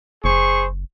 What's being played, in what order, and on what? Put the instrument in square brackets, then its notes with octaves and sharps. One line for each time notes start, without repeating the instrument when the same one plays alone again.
[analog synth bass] F#1 [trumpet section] G#4 C5 C#6